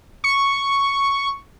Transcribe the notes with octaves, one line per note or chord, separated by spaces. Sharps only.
C#6